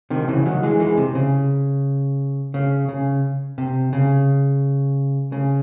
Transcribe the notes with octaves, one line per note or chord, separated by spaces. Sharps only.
C3 D#3
C#3 E3
D#3 F#3
E3 G#3
E3 G#3
C3
C#3
C#3
C#3
C3
C#3
C#3